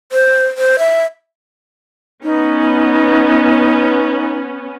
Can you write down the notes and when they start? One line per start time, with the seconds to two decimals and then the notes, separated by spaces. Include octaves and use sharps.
0.12 C5
0.58 C5
0.79 E5
2.23 B3 C#4 D#4